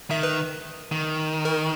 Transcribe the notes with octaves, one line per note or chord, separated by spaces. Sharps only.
D#3 E5
B4
D#3
A#4